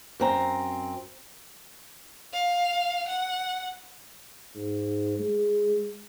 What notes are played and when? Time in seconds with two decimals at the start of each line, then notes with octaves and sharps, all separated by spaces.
0.20 F#2 C4 A#5
2.33 F5
3.08 F#5
4.56 G#2
5.19 G#3